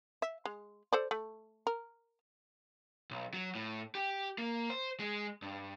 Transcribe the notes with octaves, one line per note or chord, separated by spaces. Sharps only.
E5
G#3
A4 C5 D5
A3
A#4
B1
F#3
A2
G4
A#3
C5
G#3
G2